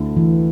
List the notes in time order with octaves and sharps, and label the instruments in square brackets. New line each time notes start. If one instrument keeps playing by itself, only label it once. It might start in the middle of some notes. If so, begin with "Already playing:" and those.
Already playing: [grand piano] D2 D3 A3 E4
[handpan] E3